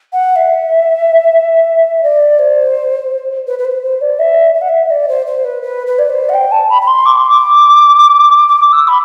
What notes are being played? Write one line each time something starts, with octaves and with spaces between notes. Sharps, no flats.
F#5
E5
D5
C5
B4
B4
C5
C5
D5
E5
E5
F#5
E5
D5
C5
C5
B4
B4
B4
D5
C5
F#5
G5
A5
B5
B5
C6
D6
C6
D6
D6
E6
B5